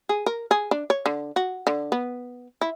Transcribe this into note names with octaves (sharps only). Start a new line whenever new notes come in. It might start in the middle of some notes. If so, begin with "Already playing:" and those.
G#4
A#4
G#4
D4
C#5
D3
F#4
D3
B3
E4